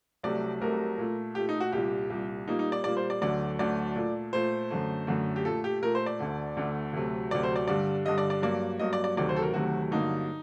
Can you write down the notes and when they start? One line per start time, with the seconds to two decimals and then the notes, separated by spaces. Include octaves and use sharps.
0.23 C2 C3 F#3 A3 D5
0.61 C2 C3 F#3 A3 A#4
0.98 A#2 A3
1.35 A#2 A3 G4
1.49 D#4
1.60 F#4
1.72 C2 A#2 G3 G4
2.10 C2 A#2 G3
2.48 A#2 G3 A#3 D#4
2.59 D#4
2.72 D5
2.84 A#2 G3 A#3 D5
2.97 C5
3.10 D5
3.21 D2 D3 F#3 A3 D5
3.59 D2 D3 F#3 A3 D5
3.96 A#2 A3
4.33 A#2 A3 C5
4.70 F#2 D3 A3
5.07 F#2 D3 A3
5.36 G4
5.45 A#2 A3 A4
5.64 G4
5.82 A#2 A3 A#4
5.95 C5
6.06 D5
6.19 D2 D3 A3
6.57 D2 D3 A3
6.93 D2 C3 F#3 A3
7.31 D2 C3 F#3 A3 D5
7.43 C5
7.56 D5
7.67 G2 D3 G3 D5
8.05 G2 D3 G3 D#5
8.18 D5
8.30 D5
8.42 G2 F#3 A#3 D5
8.79 G2 F#3 A#3 D#5
8.93 D5
9.04 D5
9.17 D2 C3 D#3 F#3 A3 D5
9.29 C5
9.36 A4
9.42 A#4
9.53 D2 C3 D#3 F#3 A3 F#4
9.91 G2 D3 F#3 A#3 D#4